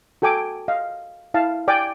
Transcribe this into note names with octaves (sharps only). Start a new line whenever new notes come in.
F#4 A4 G5 G#5 D6
D#5 F5
E4 F5 A5
D5 G5 G#5 D6